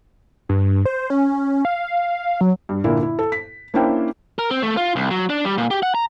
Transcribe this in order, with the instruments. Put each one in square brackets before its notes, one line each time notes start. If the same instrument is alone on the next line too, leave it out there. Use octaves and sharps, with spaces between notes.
[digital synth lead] G2
C5
C#4
F5
F#3
[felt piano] G2
A#2 D3 A#3 E4
E4
A4
B6
A#3 C#4 D4 E4 C5 G5
[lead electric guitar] A#4
C4
A3
F4
C2
F#3
D4
G3
A#2
G4
F#5
A#5